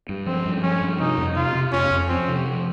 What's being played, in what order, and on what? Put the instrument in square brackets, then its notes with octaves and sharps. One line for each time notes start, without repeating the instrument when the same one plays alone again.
[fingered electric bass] G2
[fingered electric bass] F3 [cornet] C4
[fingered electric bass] G2
[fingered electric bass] F3 [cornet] C#4
[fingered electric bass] G2
[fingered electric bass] C3 [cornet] D#4
[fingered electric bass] F2
[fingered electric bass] C3 [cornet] F4
[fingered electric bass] C3
[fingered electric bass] F2 [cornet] C#4
[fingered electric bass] F2
[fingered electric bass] F3 [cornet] C4
[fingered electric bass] C3
F3